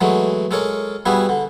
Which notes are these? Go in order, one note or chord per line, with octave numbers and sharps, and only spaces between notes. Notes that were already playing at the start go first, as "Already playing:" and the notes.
E3 F#3 G#3 A3
G#3 A4 A#4 C#5
G3 B3 E4 F#4 G#4
D3